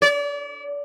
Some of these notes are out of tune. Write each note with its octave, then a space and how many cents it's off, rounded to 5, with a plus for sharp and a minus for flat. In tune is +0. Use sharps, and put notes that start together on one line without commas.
D5 -35